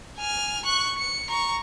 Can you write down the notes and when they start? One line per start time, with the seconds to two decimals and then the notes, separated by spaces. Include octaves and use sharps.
0.19 G#5 F6
0.66 C#6 F#6
0.98 C#7
1.29 A#5 C#6